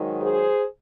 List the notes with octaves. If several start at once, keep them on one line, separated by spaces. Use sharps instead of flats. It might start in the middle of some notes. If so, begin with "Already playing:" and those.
Already playing: G#2 D#3 F#3
G#4 C5